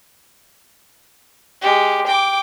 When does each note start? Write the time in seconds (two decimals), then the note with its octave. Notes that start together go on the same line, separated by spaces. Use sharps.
1.62 G#3 G4
2.06 G5 D6